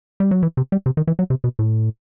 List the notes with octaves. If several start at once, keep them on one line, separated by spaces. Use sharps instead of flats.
G3
F#3
E3
C3
G3
C3
D#3
E3
F#3
C3
B2
A2